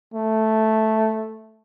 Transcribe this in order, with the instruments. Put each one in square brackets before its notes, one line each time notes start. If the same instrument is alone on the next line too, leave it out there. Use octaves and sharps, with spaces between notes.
[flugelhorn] A3